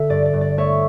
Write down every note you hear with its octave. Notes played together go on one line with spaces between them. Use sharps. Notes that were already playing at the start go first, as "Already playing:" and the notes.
Already playing: D3 E5
G2 D5
D5
G2
D5
A3 C#5 E5